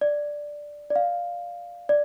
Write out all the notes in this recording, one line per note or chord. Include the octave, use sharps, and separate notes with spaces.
D5
D5
F5
D5